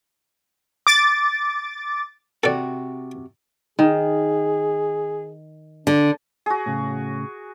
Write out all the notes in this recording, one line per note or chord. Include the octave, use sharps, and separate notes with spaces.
D6 A6
C3 F#4 A4 D5
D#3 G#4
D3 D4
F#4 G#4
A2 C#3